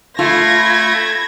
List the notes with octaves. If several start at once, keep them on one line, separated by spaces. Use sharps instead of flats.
A3 F4 A4 B5 G#6 A#6